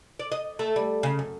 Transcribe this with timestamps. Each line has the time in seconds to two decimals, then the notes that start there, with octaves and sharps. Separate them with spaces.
0.19 D5
0.32 D#5
0.59 A3
0.76 G3
1.03 C#3
1.19 F#2